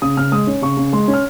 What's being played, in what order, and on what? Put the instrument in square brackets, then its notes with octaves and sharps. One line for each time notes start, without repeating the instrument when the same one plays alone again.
[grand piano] C#3 D#6
C#3 F6
G#3 D#6
C#4
C#3 C#6
C#3
G#3 C6
C#4
F6